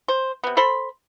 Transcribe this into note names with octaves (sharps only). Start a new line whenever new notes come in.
C5
C3 B3
A4 C5 B5 C6